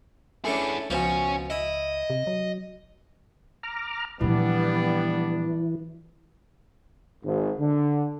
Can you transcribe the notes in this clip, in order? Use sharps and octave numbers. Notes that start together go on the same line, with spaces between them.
A3 C#4 D4 E4 G#4
C#2 B2 F3 C#4 G#5
E4 D#5
C3
F#3
A#5 D6 F6
A#2 E3 F3 G3 B3 D4
G#1
D3